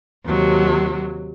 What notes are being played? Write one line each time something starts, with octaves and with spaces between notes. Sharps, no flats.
D#2 C3 F#3